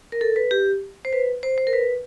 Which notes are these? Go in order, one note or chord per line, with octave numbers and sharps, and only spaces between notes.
A#4
A4
B4
G4
C5
B4
C5
C5
A#4
B4